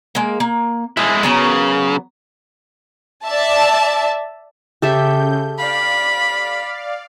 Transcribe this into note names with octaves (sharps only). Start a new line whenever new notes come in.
G#3 A#3
A#3
G#3 E4 G#5
C#3 F#3 B3 A#4
D5 E5 A5
C#3 G4 A4 E5 G6
D5 F5 B5